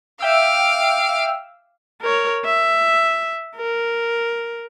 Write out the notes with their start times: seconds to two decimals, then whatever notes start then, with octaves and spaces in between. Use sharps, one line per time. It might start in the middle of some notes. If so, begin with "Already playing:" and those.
0.21 E5 F5 G5 D6 E6
2.01 A#4 C#5
2.45 E5
3.56 A#4